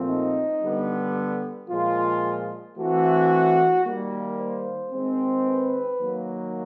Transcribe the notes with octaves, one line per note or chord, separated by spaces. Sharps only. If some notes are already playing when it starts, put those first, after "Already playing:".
Already playing: A#2 F3 A3 C4
D#4
D3 G3 B3
A#2 F3 G#3 F4
E3 A3 C4 F#4
D#3 G3 A#3
C5
D#3 G#3 C4
B4
D#3 F#3 A#3